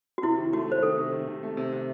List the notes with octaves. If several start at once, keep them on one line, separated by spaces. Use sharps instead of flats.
F#4
C3 E4
D#3
A3 F#4
A3 C5
D#3 A4
C3
D#3
C3
A3
C3
C3